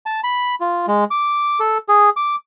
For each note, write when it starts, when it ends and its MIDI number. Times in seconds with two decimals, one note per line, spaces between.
0.06 0.20 81
0.24 0.55 83
0.61 0.86 65
0.88 1.04 56
1.11 1.59 86
1.60 1.78 69
1.89 2.10 68
2.17 2.35 86